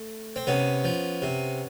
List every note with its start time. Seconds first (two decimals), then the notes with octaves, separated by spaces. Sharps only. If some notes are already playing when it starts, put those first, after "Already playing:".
Already playing: A3
0.36 C4
0.47 C3 B3 C#4
0.84 F3
1.22 C3